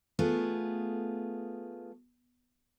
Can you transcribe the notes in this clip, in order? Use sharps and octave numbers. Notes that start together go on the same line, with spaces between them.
A3 B3 F4 G#4